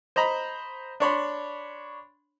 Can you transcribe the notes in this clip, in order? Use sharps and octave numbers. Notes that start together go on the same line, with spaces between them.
C5 D#5 A#5 B5
D4 C#5 B5 C6